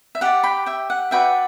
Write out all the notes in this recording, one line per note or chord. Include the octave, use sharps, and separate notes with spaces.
E5
G4 D5 F#5
G5 B5
E5 G5
F#5
F#4 B4 D5 E5 G5